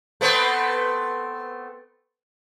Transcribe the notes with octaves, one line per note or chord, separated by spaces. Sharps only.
A3 B3 C4